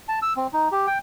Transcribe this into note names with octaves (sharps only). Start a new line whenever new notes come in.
A5
E6
C4
D#4
G4
G5